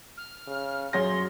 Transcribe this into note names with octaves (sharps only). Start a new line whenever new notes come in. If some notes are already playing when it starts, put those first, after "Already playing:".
F6
C#3
F#2 G#4 C#5 C6 A#6